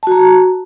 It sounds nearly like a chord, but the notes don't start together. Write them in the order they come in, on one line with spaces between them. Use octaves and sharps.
A5 F#4 A#5